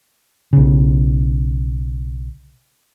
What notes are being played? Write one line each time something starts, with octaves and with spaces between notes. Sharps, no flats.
B1 C#3